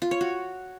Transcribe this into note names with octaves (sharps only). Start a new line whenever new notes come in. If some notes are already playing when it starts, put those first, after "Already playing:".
F4
C#5
F#4